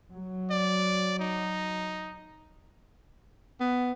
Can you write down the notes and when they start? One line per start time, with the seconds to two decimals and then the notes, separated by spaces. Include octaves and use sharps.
0.14 F#3
0.51 D5
1.20 D#4
3.60 B3